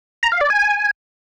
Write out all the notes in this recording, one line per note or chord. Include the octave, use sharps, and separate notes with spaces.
A#5
F5
D5
G#5